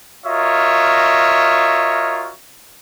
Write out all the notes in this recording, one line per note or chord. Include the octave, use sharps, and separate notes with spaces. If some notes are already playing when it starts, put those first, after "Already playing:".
F4 F#4 A#4 C#5 D#5 E5